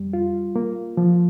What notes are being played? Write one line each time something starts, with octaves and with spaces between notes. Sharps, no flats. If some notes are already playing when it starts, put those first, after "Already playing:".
Already playing: F2 G3
F4
A#3
F3